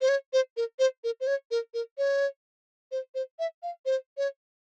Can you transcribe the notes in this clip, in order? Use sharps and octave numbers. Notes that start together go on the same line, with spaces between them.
C5
C#5
C5
A#4
C5
A#4
C5
C#5
A#4
A#4
C#5
C5
C5
E5
F5
C5
C#5